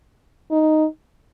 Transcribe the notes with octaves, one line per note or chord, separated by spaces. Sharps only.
D#4